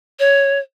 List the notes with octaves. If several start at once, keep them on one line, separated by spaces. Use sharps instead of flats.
C#5